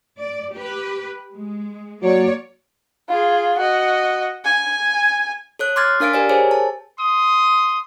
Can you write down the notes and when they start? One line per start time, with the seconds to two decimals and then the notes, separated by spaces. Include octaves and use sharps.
0.18 D5
0.54 G4 B4
1.36 G#3
2.02 F#3 A#3 C#5 D5
3.09 F4 G#4
3.58 F#4 D#5
4.45 G#5
5.59 A4 C#5 F#6
5.76 C6 D6 F6 G#6 A6
6.00 D4 A#4 F5 A6 D7
6.13 G4 A#4 B4 D5 G#5
6.29 G#4 A#4 C5 C#5 G#5
6.51 A5
6.98 C6 D#6